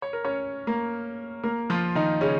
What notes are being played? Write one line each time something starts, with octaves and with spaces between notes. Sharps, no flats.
C#5
A#4
C#4 C#5
A#3 A#4
A#3 A#4
F3 F4
D#3 D#4
C#3 C#4